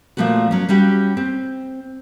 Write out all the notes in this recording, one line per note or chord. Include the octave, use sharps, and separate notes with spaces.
A#2 E3 F3 A3 B3 F#4
F#3 C#4
G3 C#4 F#4 G4
C4